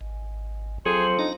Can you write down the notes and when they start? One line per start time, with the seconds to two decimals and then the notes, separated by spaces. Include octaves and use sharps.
0.01 G#1
0.86 F2 F#3 G#4 C5
1.19 D4 D#4 A#5